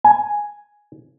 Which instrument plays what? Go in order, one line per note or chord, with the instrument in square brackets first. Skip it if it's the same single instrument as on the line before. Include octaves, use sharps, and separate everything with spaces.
[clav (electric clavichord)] G#5